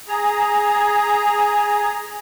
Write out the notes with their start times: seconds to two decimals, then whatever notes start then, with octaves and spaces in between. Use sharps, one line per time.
0.08 G#4 A#5